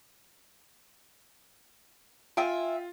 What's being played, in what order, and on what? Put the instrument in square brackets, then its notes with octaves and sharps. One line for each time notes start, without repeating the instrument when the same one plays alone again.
[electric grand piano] F4 [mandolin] E5 G5 G#5